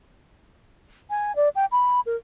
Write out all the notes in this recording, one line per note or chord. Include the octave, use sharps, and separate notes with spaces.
G#5
D5
G5
B5
A#4